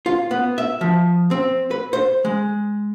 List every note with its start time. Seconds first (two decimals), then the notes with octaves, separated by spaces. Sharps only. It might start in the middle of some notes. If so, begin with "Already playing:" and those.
0.06 F4
0.31 B3
0.58 E5
0.81 F3
1.31 C4
1.71 B4
1.93 C5
2.25 G#3